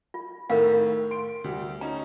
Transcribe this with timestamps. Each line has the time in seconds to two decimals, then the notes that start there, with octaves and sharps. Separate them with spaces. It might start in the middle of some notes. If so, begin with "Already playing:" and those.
0.14 F4
0.50 A2 D#3 A#4 F5
1.11 C6 D7
1.44 D2 G3
1.81 C#4 D#4 A#5